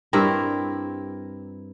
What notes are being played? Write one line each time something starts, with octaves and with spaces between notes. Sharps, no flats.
G2 C4 E4 A#4